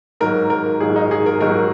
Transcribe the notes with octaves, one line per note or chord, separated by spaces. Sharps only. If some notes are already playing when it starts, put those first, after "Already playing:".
G#2 D#3 F#3 A#4
A#4
G#2 D#3 F#3 G#4
D#4
G#4
A#4
G#2 D#3 F#3 A#4